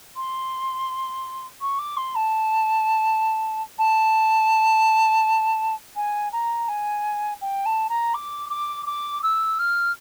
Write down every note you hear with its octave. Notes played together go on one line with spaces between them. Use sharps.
C6
C#6
D6
C6
A5
A5
G#5
A#5
G#5
G5
A5
A#5
D6
D6
D6
E6
F6